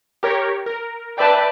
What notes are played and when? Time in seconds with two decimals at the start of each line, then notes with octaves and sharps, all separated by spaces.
0.23 G4 A#4 C#5
0.66 A#4
1.18 B4 D5 E5 G5 A5